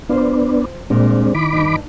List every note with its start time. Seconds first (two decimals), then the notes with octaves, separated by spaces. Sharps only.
0.09 B3 D4 F4 C5
0.90 A#2 G3 G#3 C4 D4
1.34 D#3 E4 B5 D6
1.53 G2 D#4